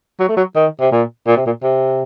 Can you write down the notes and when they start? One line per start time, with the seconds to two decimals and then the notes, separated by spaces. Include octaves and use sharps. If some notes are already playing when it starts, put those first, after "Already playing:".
0.20 F#3
0.29 A3
0.37 F#3
0.55 D#3
0.80 C3
0.92 A#2
1.27 A#2
1.37 C3
1.46 A#2
1.63 C3